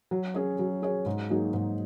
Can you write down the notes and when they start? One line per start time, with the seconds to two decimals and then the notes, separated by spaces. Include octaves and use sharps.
0.11 F#3
0.34 C#4 G#4 C#5
0.59 F#3
0.82 C#4 G#4 C#5
1.06 G#2
1.30 F#3 A#3 D#4 G#4
1.53 G#2